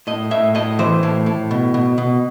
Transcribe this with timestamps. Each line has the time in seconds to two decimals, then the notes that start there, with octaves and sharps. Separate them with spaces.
0.07 A2 D#5
0.31 A2 E5
0.55 A2 D#5
0.79 E3 C5
1.03 A2
1.26 A2
1.51 B2
1.74 B2
1.98 B2